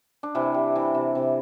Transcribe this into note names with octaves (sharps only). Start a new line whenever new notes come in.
D4
C3 E3 E4
G3
E3
C3
C3